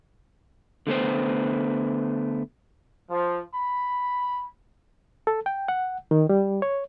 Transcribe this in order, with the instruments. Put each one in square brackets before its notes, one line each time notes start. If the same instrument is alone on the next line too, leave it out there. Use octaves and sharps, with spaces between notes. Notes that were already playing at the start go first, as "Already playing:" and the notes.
[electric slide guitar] D3 A3 B3 C5
[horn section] F3
B5
[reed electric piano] A4
G5
F#5
D#3
G3
C#5